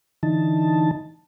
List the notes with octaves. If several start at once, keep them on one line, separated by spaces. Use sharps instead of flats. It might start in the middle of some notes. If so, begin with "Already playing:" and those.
D3 E3 D#4 A5